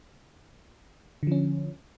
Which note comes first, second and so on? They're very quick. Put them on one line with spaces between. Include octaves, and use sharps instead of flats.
D3 F3 C#4